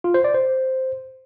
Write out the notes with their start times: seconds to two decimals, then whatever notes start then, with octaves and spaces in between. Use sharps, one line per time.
0.04 F4
0.14 C5
0.24 D5
0.34 C5